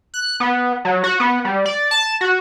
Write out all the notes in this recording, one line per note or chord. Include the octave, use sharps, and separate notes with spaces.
F#6
B3
F#3
F#4
B3
G3
D5
A5
F#4